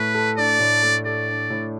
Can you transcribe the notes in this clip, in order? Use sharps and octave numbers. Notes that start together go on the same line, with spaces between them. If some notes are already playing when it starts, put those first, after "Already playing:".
Already playing: A2 A3 B4
A4
D4 D5
A2
A3
A4 D5
D4
A2